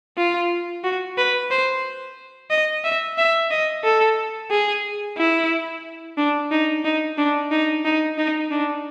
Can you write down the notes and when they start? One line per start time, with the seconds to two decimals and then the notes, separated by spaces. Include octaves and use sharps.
0.17 F4
0.84 F#4
1.18 B4
1.51 C5
2.50 D#5
2.84 E5
3.18 E5
3.51 D#5
3.84 A4
4.51 G#4
5.17 E4
6.17 D4
6.51 D#4
6.85 D#4
7.18 D4
7.51 D#4
7.85 D#4
8.18 D#4
8.51 D4